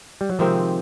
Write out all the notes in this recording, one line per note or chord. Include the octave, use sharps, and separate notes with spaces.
G3
F#3
C3 D#3 F3 G#3 C4